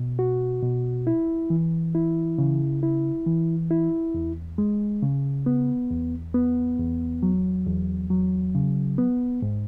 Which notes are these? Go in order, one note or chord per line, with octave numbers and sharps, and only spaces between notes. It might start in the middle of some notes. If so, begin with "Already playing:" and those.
Already playing: B2
F#4
B2
E4
E3
E4
C#3
E4
E3
E4
E2
G#3
C#3
B3
E2
B3
E2
F#3
E2
F#3
C#3
B3
G#2